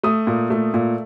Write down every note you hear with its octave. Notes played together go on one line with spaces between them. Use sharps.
A3 D#6
A#2
A3
A#2